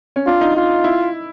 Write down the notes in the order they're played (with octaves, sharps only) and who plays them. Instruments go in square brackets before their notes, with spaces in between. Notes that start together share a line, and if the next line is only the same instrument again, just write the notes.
[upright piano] C#4
[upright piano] D4 [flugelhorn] F4
[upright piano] D#4
[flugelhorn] F4
[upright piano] E4